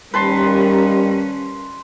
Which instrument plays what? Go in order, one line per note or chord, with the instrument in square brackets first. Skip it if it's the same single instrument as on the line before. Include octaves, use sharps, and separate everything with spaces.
[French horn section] D#2 A#4 [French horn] G3 [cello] C#4 [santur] B4 A5 C6